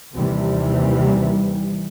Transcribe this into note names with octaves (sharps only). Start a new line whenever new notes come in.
D#2 C3 E3 G3